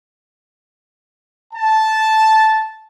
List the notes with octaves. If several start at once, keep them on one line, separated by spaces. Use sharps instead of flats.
A5